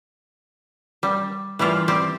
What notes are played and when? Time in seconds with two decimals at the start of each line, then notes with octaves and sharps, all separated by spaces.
1.03 G3
1.59 E3 G3 E4 F4
1.88 G3 C4 G4